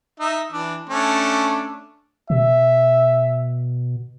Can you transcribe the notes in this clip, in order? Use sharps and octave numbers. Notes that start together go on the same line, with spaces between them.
D#4 E5
E3 D4
A3 C#4 D4
B2 E5